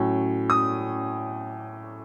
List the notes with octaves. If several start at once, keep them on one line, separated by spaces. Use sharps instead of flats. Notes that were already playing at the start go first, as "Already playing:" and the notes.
Already playing: A2 F#3 C#4
D#6